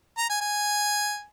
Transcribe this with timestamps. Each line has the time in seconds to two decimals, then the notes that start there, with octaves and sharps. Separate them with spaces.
0.18 A#5
0.29 G#5
0.41 G#5